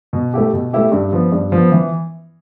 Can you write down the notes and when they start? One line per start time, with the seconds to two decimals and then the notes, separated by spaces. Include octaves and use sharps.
0.13 B2
0.34 A3 E4 G4
0.53 B2
0.73 A3 E4 G4
0.92 G2
1.12 F3 B3
1.32 G2
1.52 F3 B3
1.72 E3